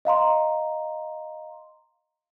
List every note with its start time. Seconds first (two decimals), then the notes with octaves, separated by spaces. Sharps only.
0.05 D#5 F5 A#5 C6